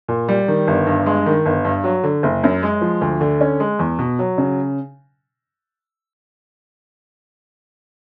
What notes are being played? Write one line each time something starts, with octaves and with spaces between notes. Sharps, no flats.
A#2
G3
D#3
G1
G2
G#3
D#3
G1
G2
F#3
D3
F#1
F#2
G#3
F3
D2
D3
C#4
G#3
E2
B2
F#3
C#3